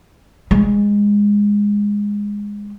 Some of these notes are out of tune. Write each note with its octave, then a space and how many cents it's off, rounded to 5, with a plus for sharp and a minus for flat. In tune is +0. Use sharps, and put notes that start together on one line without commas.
G#3 -15